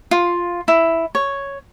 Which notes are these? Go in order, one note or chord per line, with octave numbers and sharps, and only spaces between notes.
F4
E4
C#5